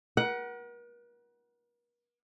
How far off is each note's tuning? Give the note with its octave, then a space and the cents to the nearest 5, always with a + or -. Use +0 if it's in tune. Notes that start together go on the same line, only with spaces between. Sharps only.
A#4 +45 F#5 +15